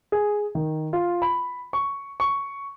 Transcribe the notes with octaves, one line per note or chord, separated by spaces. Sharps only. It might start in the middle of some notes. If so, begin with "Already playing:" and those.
G#4
D#3
F4
B5
C#6
C#6